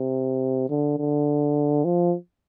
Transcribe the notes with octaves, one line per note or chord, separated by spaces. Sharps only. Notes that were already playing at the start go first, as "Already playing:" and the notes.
Already playing: C3
D3
D3
F3